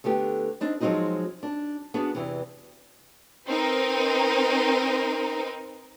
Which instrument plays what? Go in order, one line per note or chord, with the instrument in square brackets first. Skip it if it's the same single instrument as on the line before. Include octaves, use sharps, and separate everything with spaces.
[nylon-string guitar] D3 A3 B3 G4
C4 D4 D#4
F3 F#3 G#3 C4 D#4 F#4
D4
B3 D4 F#4 G#4
E2 C3 E3
[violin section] C4 D#4 A#4 B4